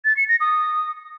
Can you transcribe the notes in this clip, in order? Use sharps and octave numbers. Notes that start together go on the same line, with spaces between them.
A6
C#7
A#6
D#6